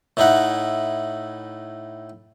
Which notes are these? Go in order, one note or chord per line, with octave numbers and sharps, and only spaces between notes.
A2 D#4 E4 F#5